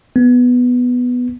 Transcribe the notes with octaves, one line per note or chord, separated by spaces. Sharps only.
B3